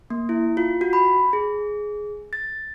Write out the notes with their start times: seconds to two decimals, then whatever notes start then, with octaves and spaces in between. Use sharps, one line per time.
0.10 A#3
0.29 E4
0.57 F4
0.81 F#4
0.93 B5
1.33 G#4
2.33 A6